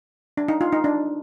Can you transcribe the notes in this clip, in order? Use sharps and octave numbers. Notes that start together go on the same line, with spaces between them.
D4
D#4
F4
D#4
D4